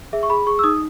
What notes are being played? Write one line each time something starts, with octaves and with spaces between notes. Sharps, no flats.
G#4 E5
C#6
G#4 B5
G#4 C#6
E6
D#4 D#6